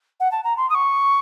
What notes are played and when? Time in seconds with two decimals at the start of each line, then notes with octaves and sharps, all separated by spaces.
0.20 F#5
0.31 A5
0.44 A#5
0.57 C6
0.70 D#6
0.75 C#6